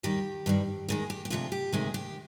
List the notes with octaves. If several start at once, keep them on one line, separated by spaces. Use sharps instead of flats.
D#2 D#3 G3 G4
G2 D#3 G3
D#2 D#3 G#3 G#4
G4
G4
D2 C3 F3 G#3 F4
G4
D2 C3 D#3 G#3 G#4
G4